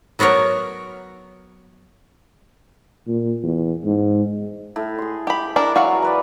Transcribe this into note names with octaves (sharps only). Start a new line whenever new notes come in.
F#3 B3 F#4 A#4 C#5
A#2
E2
G#2
A2
G#4 C6
G4 B5
D4 E4 A#4 D5
E3 F#3 F#4 F5 F#5
A#4 B4 D5